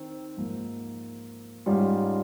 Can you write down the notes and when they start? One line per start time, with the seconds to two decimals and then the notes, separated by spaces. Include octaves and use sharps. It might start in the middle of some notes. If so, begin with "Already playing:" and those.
Already playing: D#3 C4
0.37 G#2 F3 A#3
1.66 G#2 G3 C#4 F4